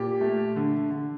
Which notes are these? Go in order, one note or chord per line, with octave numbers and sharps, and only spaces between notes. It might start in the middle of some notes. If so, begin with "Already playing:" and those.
Already playing: A#2 G4
A3
D3
D3